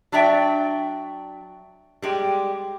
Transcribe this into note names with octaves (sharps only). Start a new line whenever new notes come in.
F#3 D4 F#4 D5 E5 G5
G3 G#3 G4